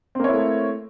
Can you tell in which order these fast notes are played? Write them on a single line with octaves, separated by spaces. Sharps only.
C4 A#3 C#5 E4 A3